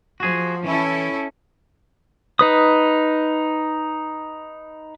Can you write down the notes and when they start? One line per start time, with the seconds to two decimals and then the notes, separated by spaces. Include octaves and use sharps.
0.20 F3 F#4 G#4
0.64 E3 C#4 E4 A4
2.39 D#4 B4 D#6